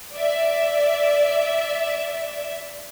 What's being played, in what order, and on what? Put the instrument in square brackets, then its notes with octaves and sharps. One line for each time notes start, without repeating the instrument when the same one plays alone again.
[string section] D5 E5